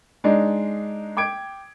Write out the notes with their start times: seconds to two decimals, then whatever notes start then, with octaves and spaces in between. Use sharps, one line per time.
0.24 G#3 D4 D#4
1.17 G5 D6 G#6 D7